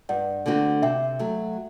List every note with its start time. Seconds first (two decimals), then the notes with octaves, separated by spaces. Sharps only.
0.09 G2 D5 F#5
0.46 D3 A3 C4 F#4
0.82 C3 E5 G5
1.19 F#3 A3